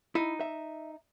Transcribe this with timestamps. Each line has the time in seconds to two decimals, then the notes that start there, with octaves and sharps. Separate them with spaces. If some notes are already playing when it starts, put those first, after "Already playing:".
0.15 D#4 E4
0.41 E5